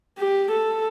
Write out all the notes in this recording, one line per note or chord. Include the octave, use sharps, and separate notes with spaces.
G4
A4